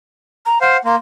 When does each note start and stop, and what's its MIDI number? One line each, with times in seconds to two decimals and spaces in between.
0.46 0.59 82
0.61 0.77 72
0.61 0.77 77
0.61 0.84 78
0.85 0.96 58
0.85 0.96 84